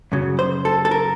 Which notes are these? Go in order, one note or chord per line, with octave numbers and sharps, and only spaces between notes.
F#2 C#3 F#3
C5
A4
A4
A#4